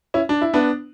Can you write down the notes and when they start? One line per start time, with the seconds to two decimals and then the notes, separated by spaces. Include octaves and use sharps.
0.14 C#4 E4
0.29 D4
0.42 E4
0.53 B3 D4